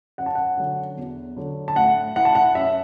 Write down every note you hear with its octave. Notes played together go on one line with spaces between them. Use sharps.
F#2 F#5
A5
F#5
D3 F#3
E2
D3 F#3
A5
A2 F#5
E3 F#5
A5
F#5
F#2 E5